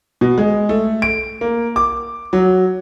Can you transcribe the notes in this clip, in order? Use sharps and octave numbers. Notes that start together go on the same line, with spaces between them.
B2
G#3
A3
D7
A#3
D6
F#3